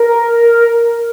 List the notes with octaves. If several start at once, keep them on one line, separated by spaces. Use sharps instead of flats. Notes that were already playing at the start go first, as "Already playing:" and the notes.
Already playing: A#4